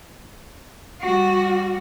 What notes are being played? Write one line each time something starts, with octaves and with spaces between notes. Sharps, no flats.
G3 F#4